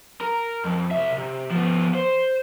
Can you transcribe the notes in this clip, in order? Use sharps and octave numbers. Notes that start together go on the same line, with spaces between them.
A#4
F2
C2 E5
C3
F3 B3
C5